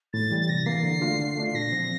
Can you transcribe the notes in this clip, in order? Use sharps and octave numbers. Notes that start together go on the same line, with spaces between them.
A2 A6
E3 G3
A6
C3 A#6
E3 A#3 C7
D3
A3 D4 F4
D3
A3 D4 F4
C7
A#2 A#6
F3 C4